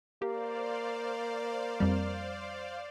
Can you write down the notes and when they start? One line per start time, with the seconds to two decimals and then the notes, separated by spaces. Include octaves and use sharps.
0.22 A#3 G4 C5 D5 F5
1.80 F2 G3